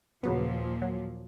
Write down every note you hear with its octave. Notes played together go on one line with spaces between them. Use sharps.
D#2 A#2 C#3 F3 F#3 B3
F#3